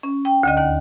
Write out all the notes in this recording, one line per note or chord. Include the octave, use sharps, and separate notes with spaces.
C#4
G5
D2 D3 D#5
D#2 F#5